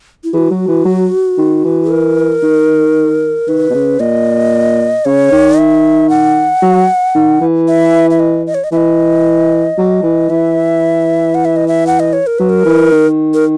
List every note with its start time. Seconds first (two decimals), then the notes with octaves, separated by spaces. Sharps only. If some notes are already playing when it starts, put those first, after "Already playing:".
0.24 E4
0.33 E3 G#4
0.38 F#4
0.50 F#3
0.68 E3
0.85 F#3
1.38 D#3
1.64 E3
1.91 A#4
2.43 D#3
3.48 D#3 B4
3.70 B2
3.74 C#3
4.00 A#2 D#5
5.05 C#3 C#5
5.32 D#3
5.58 E5
6.09 F#5
6.62 F#3
7.15 D#3
7.41 E3
7.68 E5
8.10 E5
8.19 D#5
8.46 D#5
8.54 C#5
8.64 D#5
8.72 E3 E5
8.77 D#5
9.78 F#3
10.03 E3
10.29 E3 E5
11.35 F#5
11.45 E5
11.56 D#5
11.68 E5
11.87 F#5
12.00 D#5
12.13 C#5
12.27 A#4
12.38 F#3 B4
12.49 A#4
12.65 E3
12.92 D#3
13.34 A#4